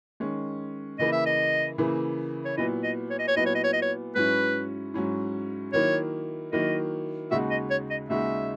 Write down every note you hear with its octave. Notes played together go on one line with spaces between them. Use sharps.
D#3 G#3 C#4
C#3 E3 A#3 E4 D#5
E5
D#5
C#3 E3 A#3 E4
C#5
A#2 F#3 B3 E4 D#5
D#5
C#5
D#5
C#5
A#2 F#3 B3 E4 D#5
C#5
D#5
C#5
D#5
C#5
G#2 F#3 C#4 E4 B4
G#2 F#3 C#4 E4
D#3 F#3 A#3 E4 C#5
D#3 F#3 A#3 E4 D#5
D#2 C#3 G#3 D#4 F#4 E5
D#5
C#5
D#5
D#2 C#3 G#3 D#4 F#4 E5